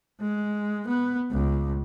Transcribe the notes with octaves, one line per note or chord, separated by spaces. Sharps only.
G#3
B3
C#2